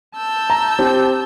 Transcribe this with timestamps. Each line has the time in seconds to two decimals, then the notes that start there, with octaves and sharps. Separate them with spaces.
0.16 A5 E6 G6
0.50 A#5
0.79 C4 G4